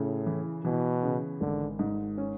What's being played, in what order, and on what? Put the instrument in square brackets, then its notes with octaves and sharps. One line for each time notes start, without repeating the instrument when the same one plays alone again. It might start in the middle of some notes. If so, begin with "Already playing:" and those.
Already playing: [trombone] A2 [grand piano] C#3
[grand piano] E3
[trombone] B2 [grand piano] E3
[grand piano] C#3
[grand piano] G#1 [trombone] D3
[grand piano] G#2
C#4